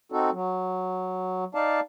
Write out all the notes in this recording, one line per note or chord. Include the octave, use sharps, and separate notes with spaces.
C4 D#4 F#4 A4
F#3
D#4 D5 F5 A5